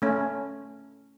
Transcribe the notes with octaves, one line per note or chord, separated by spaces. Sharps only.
A3 C#4